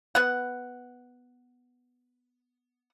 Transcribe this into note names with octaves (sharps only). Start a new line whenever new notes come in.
B3 F#5